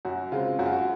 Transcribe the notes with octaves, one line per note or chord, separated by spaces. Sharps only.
F#2 F#4
C#3 G#3 C4 F4
F#2 F#4
F4
F#4